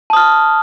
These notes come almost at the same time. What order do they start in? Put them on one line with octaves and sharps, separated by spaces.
A5 D#6 F6